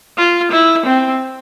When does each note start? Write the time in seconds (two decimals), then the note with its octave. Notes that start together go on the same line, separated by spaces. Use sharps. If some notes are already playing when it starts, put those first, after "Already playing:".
0.17 F4
0.52 E4
0.86 C4